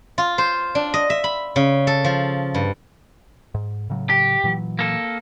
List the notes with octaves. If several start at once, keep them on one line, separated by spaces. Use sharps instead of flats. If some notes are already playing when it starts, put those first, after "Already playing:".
F4
C5
D4
D#5
E5
B5
C#3
A4
F3
G2
G#2
A2 C#3 F#3
G4
A#2 E3 F#3
A#3 A4